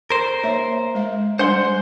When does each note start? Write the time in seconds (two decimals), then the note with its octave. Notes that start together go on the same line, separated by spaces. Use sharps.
0.10 A#4 C5
0.43 A#3 C#5 E5
0.95 G#3 F5
1.39 G3 D4 C5 F#5 C6